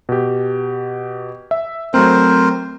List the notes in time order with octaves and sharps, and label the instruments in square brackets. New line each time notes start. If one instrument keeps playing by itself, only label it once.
[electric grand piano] B2 G4
E5
[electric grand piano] F#3 A3 C4 [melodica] A#4 C5